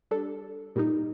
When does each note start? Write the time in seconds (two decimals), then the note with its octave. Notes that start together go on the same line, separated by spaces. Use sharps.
0.11 G3 D4 A4
0.76 A#2 G3 A#3 D#4